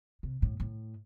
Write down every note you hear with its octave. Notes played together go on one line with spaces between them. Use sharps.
C3
A2
A2